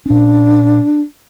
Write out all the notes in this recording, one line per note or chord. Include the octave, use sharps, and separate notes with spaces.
A#2 C#4 D4